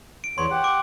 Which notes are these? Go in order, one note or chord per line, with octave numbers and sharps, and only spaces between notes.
D7
E2 B3 C#5 C6
G4 F#5
D6 D7